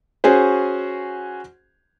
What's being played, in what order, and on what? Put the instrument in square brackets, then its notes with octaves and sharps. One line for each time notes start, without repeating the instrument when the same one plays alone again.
[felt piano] C#4 F#4 G#4 C5